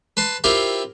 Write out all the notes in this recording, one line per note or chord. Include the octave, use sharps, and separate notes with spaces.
B4 A5 C6
C4 E4 F4 G4 A#4